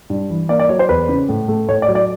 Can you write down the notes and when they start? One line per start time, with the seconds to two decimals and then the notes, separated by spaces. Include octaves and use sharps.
0.10 G2
0.30 E3
0.49 A#3 D5
0.59 D5
0.69 F#3 C#5
0.79 C5
0.89 E2 B4
1.09 C#3
1.29 A2
1.48 A3
1.68 A2 C#5
1.82 D5
1.88 F#3
1.95 D5